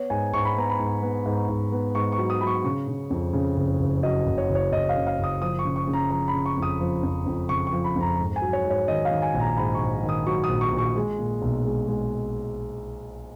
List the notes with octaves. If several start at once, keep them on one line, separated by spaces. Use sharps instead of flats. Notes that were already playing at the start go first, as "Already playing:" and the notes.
Already playing: B3 C#5
G#2 G#5
G#2 C#6
B5
B3 A#5
B5
G#2
B3
G#2
G#2
B3
G#2 C#6
C#6
F#3
D#6
F#3 B5
C#6
C#3 C#6
C#3
F2
C#3
F#1
F#1
F#3 D#5
F#1
C#5
F#1
C#5
F#1 D#5
F5
C#3
F5
F#1
D#6
F3 D#6
C#6
C#3
C#6
C#3
A#5
F3 A#5
B5
C#3
C#6
F2
D#6
F3
F2
F2
C#3 C#6
C#6
F3
B5
F2
A#5
G#2
G#5
F#3
C#5
G#2
C#5
D#3 D#5
F5
D#3
G#5
A#1
A#5
G#2 B5
C#6
A#1
D#3
D#6
F#3 C#6
D#6
A#1
C#6
A#1
C#6
G#3
A#2
B1
G#3
G#3